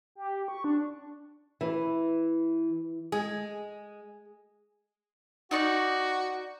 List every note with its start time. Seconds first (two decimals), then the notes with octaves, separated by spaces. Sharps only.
0.15 G4
0.48 C#6
0.64 D4
1.61 E3
3.12 G#3 G#4
5.51 D#4 F#4 D5 C#6